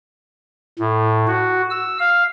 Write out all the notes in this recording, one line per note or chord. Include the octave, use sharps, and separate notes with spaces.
A2
F#4
E6
F5